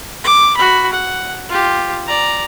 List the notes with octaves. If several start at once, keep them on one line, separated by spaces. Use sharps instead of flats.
D6
F#4 B5
F#5
F4 G4
D5 A#5